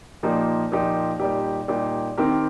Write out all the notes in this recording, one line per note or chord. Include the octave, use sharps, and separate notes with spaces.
A#2 F3 A#3 D#4 G4
A#2 F3 A#3 D#4 G4
A#2 G3 D#4 G4
A#2 G3 D#4 G4
D#3 C4 G4 A#4